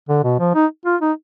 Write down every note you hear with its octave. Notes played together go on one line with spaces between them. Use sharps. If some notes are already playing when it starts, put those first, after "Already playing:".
D3
B2
F3
D#4
F4
D#4